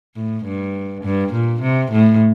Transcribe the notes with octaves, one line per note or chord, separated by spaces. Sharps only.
A2
G2
G2
A#2
C3
A2